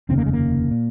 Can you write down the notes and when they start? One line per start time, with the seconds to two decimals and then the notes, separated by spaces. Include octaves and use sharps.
0.09 F1 D#2 C#3 C4
0.18 A#3
0.26 G#3
0.33 A#3
0.71 A#2